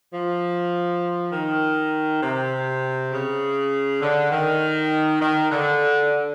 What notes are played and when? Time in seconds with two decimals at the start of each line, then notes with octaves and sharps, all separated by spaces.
0.13 F3
1.32 D#3
2.22 C3
3.12 C#3
4.01 D3
4.31 D#3
5.21 D#3
5.50 D3